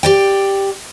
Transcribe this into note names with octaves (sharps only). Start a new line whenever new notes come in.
G4 D5 G5